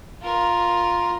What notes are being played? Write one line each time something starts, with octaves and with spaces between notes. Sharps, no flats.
F4 A#4